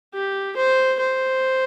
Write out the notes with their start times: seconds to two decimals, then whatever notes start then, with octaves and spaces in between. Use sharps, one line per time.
0.14 G4
0.56 C5
1.00 C5